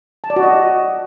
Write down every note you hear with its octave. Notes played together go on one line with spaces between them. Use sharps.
A5
D5
F#4
D#5